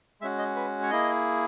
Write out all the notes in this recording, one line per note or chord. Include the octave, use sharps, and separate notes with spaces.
G#3 C#4 F#4 E5
D#5
B4
C#5
A#3 E4 G#4 D#5